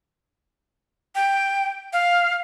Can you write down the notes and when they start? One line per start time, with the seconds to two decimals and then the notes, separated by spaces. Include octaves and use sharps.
1.15 G5
1.93 F5